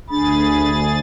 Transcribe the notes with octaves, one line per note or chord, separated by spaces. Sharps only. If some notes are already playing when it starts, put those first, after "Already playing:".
D2 D4 G#4 B5 A6